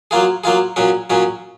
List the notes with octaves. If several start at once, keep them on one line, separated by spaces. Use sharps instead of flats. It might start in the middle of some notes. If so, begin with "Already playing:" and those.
F#3 A#3 F4 G#4
F#3 A#3 F4 G#4
A#2 F#3 C#4 G#4
A#2 F#3 C#4 G#4